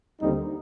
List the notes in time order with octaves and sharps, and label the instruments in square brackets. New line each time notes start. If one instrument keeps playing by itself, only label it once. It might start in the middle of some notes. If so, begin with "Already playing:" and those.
[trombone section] D#2 D3 G3 C4 D#4